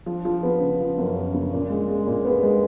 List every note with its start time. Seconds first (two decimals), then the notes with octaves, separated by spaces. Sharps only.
0.06 F3
0.25 F3
0.43 B3
0.61 C#3
0.80 F3
0.98 F#2
1.16 B3
1.34 C#3
1.52 A#2
1.70 G#3
1.88 G#3
2.06 A#2
2.25 B3
2.43 G#3